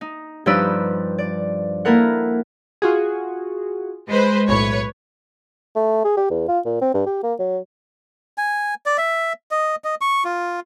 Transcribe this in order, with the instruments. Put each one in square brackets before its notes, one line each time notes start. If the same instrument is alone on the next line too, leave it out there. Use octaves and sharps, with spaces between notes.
[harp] D#4
G2 F3 D#4 B4 D5 E6
D5
A#3 E4 A4 A#4 F#5
[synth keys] F4 F#4 G#4
[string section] G#3 B4 C5
[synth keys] B1 A2 [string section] B4 C#5
[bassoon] A3
G#4
G4
E2
F4
A#2
C4
G2
G4
A#3
F#3
[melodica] G#5
D5
E5
D#5
D#5
C#6
F4